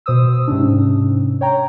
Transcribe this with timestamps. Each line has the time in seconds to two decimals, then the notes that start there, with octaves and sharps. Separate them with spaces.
0.06 B2 C5 D#6 E6
0.48 G#2 C3 C#4 D4
1.41 C#5 G5 A#5